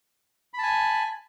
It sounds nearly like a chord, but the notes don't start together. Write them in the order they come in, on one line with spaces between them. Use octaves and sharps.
B5 A5 G#5